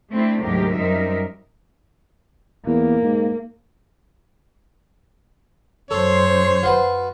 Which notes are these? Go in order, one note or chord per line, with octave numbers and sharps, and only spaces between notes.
A3 C4 D4 E4
D2 G#2 C3 F#3 G4 A#4
F#2 G3 C4 D#4 A#4 E5
E2 A#3
G#2
F#2 A4 C5 C#5
F4 F#4 B4